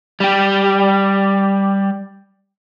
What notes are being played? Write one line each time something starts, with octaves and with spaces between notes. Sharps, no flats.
G3 G4